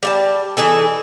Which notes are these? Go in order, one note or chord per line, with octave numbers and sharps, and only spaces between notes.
G3 E5 A5
E3 D#4 G#4 A4